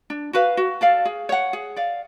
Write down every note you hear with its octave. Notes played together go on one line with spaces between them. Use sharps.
D4
F#4 B4 F5
F#4
A4 D5 F5
G#4
C#5 F#5
G#4
D5 F5